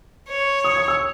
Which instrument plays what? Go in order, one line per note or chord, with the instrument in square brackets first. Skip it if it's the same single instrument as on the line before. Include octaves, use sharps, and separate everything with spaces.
[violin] C#5
[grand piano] D#6
D#6
E6